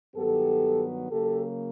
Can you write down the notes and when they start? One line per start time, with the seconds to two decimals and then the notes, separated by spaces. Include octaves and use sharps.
0.15 G2 D#3 F#3 B3 G4 A4
1.11 C#3 F#3 A#3 G4 A4